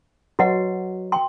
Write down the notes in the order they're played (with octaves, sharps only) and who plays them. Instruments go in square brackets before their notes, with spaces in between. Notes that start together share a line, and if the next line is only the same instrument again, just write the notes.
[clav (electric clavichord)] F#3 [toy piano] F#4 B4 D#5 F#5
[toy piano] G5 C6